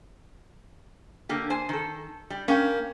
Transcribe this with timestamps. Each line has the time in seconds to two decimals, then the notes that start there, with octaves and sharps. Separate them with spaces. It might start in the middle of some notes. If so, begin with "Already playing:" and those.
1.29 D3 A#3 G4
1.50 C5 G#5
1.69 D#3 A4
2.30 G3
2.48 A#3 C#4 G5